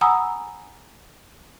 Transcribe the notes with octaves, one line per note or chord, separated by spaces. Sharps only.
F#5 G#5 A#5 B5 D#6 E6